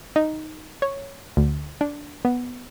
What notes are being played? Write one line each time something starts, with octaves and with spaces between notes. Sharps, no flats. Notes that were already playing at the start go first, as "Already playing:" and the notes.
D#4
C#5
D2
D4
B3